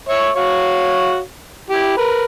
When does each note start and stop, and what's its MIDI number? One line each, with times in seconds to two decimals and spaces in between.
0.09 0.30 73
0.09 0.30 76
0.09 0.30 85
0.36 1.20 66
0.36 1.20 73
0.36 1.20 77
1.70 1.94 64
1.70 1.94 67
1.97 2.25 70
1.97 2.25 71